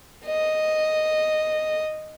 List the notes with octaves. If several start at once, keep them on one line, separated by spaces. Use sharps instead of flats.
D#5